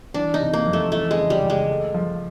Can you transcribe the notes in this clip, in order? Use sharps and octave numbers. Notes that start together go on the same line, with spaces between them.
E3 D4
D#4
C3
A#3
F2
A3
E3 A3
G#3
C#3
G3
C#2
G#3
A3
F3